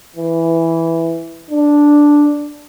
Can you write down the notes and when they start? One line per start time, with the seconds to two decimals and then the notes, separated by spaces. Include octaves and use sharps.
0.16 E3
1.50 D4